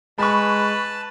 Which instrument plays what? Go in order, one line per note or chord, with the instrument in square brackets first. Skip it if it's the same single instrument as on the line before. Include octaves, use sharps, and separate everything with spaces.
[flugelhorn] G#3 [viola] B4 [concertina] A5 [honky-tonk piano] B5 C#6